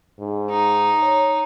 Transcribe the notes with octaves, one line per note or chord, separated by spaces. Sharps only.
G#2
D#4
C#5